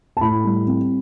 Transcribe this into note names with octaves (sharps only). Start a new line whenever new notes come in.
A5
A2 B5
G3
C4